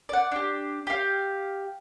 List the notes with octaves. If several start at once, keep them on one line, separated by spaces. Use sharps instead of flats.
D5 F#5
D4 G4
G4 F5